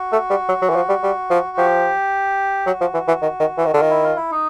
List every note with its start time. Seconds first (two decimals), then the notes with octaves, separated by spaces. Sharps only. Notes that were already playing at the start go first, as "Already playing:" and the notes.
Already playing: F#4
0.12 A3
0.30 G3
0.49 F#3
0.62 F#3
0.70 E3
0.76 F3
0.89 G3
1.03 G3
1.30 F3
1.57 F3 G4
2.66 F#3 F#4
2.81 F3
2.94 E3
3.08 E3
3.22 D#3
3.40 D#3
3.58 E3
3.66 D#3
3.74 D3 F4
3.82 D#3
3.90 E4
4.03 F4
4.16 E4
4.31 D#4